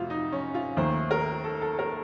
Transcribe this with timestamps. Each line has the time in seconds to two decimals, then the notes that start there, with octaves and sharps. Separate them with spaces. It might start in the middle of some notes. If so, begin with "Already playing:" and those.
Already playing: F2 C3 A3 F4 F#4
0.10 D#4
0.32 C#4
0.54 F4
0.77 D#2 D#3 A3 C5
1.11 A#4
1.44 A4
1.62 A4
1.79 A#4